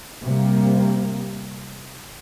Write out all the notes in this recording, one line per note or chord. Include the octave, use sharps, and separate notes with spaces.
C3 G3 A#3